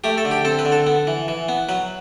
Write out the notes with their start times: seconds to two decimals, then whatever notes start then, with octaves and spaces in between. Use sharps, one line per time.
0.04 A3 G4
0.18 A4
0.25 D3
0.31 G4
0.45 C4 A4
0.59 B4
0.65 D3
0.72 A4
0.87 B3
1.07 E3
1.28 E3
1.48 B3
1.69 F#3 B4